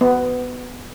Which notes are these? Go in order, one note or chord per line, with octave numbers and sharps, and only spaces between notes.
B3